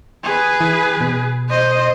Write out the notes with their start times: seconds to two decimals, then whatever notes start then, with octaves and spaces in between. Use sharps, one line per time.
0.24 G#4 B4
0.60 E3
1.01 B2
1.50 C5 D#5